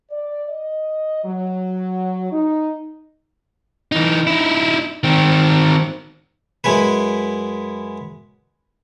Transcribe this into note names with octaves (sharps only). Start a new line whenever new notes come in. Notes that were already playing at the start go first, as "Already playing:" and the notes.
D5
D#5
F#3
D#4
E3 D#4
D#4 E4
D#3 C4
F#2 G#3 E4 B4